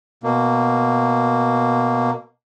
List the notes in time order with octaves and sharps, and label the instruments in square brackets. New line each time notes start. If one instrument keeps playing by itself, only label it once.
[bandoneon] B2 A#3